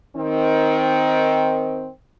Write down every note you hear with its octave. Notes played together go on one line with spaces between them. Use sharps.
D#3 C4